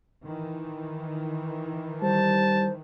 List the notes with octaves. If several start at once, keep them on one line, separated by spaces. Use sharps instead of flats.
D#3 E3
G3 C5 A5